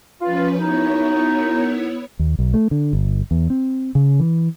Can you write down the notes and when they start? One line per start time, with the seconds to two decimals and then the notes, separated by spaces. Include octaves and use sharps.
0.21 F3 C#4 F4 B4
0.58 F#2 B3 D#4 E4 C#5
2.19 D#2
2.39 B1
2.54 A3
2.71 D3
2.93 G1
3.31 E2
3.50 C4
3.95 C#3
4.20 E3